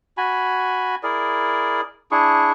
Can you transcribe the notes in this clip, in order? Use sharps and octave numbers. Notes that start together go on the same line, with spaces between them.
F#4 G#5 B5
E4 G#4 A#4 D5
D4 E4 G#4 C#6